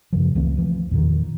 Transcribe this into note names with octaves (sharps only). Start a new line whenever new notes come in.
F#2 C#3 F3
C#2 E3 A3 C4
E3 F3
E2 A#2 D#3